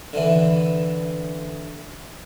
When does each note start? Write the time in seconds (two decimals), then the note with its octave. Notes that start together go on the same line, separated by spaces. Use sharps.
0.13 D3 E3